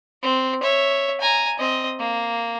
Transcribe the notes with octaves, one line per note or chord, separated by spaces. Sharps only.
C4
C#5 E5
G#5 A#5
C4 D#5
A#3